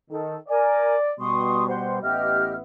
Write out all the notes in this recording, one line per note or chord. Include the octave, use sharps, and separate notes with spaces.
D#3 A4
A#4 D5 G#5
B2 G3 C6 C#6 D#6
C5 F#5 C6
A1 B3 G4 D#5 E5 F6